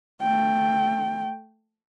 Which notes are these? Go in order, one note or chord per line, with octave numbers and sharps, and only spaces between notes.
A3 G5